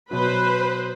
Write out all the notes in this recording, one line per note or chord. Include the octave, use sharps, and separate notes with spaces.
B2 F#3 B4 C5